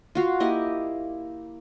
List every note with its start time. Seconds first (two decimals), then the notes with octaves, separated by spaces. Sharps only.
0.15 F4 F#4 F5
0.40 A#3 E4 G4 D#5